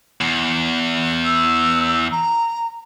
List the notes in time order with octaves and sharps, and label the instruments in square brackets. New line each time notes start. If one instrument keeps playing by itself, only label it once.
[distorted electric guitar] E2
[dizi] E6
A#5